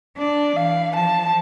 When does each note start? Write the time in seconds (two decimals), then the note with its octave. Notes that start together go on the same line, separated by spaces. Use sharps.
0.17 D4 D5
0.57 E3 F5
0.96 F3 A5